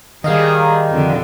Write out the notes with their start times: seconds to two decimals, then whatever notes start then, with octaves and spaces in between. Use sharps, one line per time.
0.24 D#3 G3 G#4 D#5 F5
0.90 F2 D3